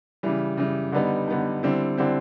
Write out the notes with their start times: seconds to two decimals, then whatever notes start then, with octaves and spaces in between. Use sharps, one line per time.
0.23 C#3 E3 G3
0.57 C#3 E3 G3
0.92 D3 G3 B3 D#4
1.28 D3 G3 B3 D#4
1.63 D3 G3 C4 E4
1.98 D3 G3 C4 E4